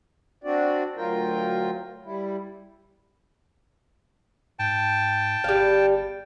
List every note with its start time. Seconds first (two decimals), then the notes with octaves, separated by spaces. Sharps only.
0.44 C4 D4 F#4 D5
0.96 D2 F#3 F4 A#4 G5
2.05 G3 E4
4.59 G#2 G5 A5
5.44 G1 G3 F5